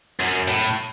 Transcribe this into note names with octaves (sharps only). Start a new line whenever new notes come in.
F#2
A2